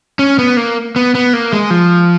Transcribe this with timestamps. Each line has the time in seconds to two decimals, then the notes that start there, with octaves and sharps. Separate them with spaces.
0.19 C#4
0.39 B3
0.57 A#3
0.96 B3
1.15 B3
1.33 A#3
1.53 G#3
1.70 F3